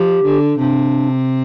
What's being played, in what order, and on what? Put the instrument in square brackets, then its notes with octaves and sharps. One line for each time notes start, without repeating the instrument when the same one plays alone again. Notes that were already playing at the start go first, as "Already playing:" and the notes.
Already playing: [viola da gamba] F3 [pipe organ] G4
[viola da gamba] D3
[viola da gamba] C3 [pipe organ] D4